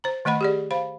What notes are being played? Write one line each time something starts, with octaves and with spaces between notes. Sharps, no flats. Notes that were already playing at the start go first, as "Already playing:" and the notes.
C5 A#5
D#3 A3 D#5 F#5 B5
G4 G#4 D5
C5 F5 B5